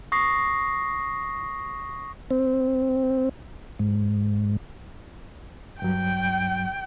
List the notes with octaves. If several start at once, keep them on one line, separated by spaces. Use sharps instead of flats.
C#6 D#6 A#6 C7
C4
G#2
G2 F#3 G5